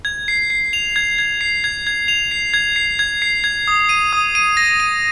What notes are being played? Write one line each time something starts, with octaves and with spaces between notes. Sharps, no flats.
G#6
C7
C7
F7
G#6
G#6
C7
G#6
G#6
F7
C7
G#6
C7
G#6
C7
G#6
D#6
D#7
D#6
D#7
A#6
D#7